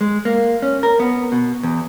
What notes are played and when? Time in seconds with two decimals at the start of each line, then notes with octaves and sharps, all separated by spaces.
0.01 G#3
0.25 A#3
0.62 C#4
0.83 A#4
1.00 B3
1.32 B2
1.63 E2